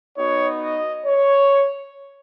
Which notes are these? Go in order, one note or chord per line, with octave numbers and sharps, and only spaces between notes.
B3 D#4 F#4 C#5
D#5
C#5